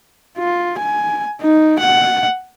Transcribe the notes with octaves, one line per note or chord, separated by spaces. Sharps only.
F4
G#5
D#4
F#5